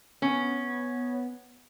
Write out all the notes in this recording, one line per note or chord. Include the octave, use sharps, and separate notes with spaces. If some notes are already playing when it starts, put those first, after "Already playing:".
B3 C#4